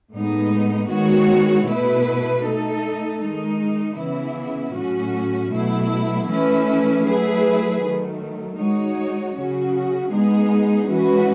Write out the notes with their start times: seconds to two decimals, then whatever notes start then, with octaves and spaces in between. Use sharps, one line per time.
0.12 A2 G#3 B3 D#4
0.89 D#3 G#3 B3 F#4 C#5
1.65 B2 A3 E4 B4
2.42 A3 D#4 A4
3.19 D#3 G#3 D#4
3.96 C#3 E3 B3 E4
4.73 A2 F#3 C#4 F#4
5.49 B2 F#3 A3 E4
6.26 E3 A3 C#4 E4 B4
7.03 F#3 A3 E4 G#4 B4
7.80 D#3 F#3 A3
8.56 G#3 D#4 F#4 C#5
9.34 C#3 F#3 C#4 F#4
10.11 G#3 B3 D#4 G#4
10.87 E3 G#3 C#4 F#4 B4